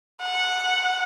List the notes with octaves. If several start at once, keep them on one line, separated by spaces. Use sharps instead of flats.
F#5